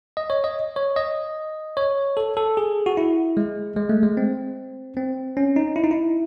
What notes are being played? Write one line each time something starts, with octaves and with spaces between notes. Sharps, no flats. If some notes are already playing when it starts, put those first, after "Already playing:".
D#5
C#5
D#5
C#5
D#5
C#5
A4
A4
G#4
F#4
E4
G#3
G#3
A3
G#3
C4
C4
C#4
D#4
E4
D#4
E4